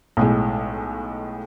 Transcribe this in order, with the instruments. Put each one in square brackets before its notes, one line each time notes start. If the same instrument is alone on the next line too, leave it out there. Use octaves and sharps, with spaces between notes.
[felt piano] B1 A2 G#3